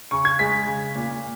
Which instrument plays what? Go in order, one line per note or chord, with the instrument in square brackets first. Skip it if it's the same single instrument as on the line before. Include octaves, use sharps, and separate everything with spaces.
[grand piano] C#3 C#6
G#6
G#3 B6
C#3
A#2